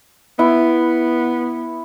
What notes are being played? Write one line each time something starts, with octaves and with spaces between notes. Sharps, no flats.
B3 E4